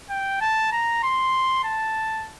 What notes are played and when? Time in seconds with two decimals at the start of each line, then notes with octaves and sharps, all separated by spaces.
0.10 G5
0.41 A5
0.72 A#5
1.03 C6
1.64 A5